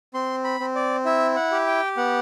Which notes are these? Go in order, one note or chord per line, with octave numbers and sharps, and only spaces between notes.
C4 C6
B5
C4
D5
E4 E5
F#5
G4
G5
B3 F#5